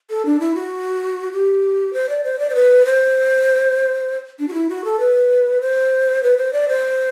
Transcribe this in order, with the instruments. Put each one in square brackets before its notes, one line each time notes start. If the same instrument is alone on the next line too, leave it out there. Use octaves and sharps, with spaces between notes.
[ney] A4
D4
E4
F#4
G4
C5
D5
C5
D5
C5
B4
C5
D4
F#4
E4
F#4
A4
B4
C5
B4
C5
D5
C5